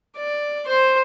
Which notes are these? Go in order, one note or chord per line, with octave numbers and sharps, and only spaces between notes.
D5
C5 C6